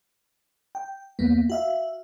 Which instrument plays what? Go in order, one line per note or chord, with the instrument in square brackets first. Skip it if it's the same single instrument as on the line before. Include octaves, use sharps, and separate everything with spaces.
[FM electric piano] G5
E2 A#3 B3
F#4 E5 F5